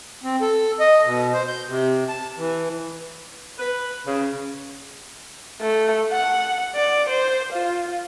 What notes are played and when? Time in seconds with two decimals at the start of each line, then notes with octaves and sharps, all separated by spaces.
0.24 C4
0.41 A4
0.80 D#5
1.05 B2
1.34 C5
1.48 G6
1.68 C3
2.08 A5
2.37 E3
3.59 B4
4.07 C#3
5.61 A3
6.11 F#5
6.75 D5
7.09 C5
7.53 F4